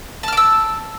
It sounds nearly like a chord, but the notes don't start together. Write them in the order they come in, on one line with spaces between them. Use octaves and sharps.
A5 F6 D6 E6